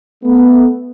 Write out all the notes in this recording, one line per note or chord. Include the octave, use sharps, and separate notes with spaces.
A3 B3